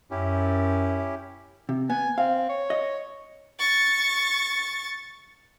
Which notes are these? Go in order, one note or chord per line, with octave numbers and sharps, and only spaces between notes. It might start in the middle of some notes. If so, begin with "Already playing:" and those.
F#2 C#4 E4 G4
C3
B3 G#5
C4 F5
C#5
D#5
C#6 A6